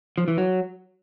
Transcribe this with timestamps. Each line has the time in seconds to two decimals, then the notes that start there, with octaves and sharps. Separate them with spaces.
0.18 F3
0.28 E3
0.38 F#3